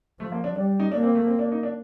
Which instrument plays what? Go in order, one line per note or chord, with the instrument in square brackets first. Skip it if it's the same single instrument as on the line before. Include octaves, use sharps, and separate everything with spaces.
[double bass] F3 [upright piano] A3
[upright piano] A#3
D4
[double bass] G3 [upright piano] D4
[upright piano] D#4
[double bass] A#3 [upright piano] D4
[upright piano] C4
A3
C4
D4
D#4
D4